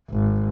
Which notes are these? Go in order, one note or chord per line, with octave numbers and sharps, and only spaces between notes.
G#1